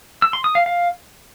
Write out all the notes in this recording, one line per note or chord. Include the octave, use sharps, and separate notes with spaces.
E6
C6
D#6
F5
F5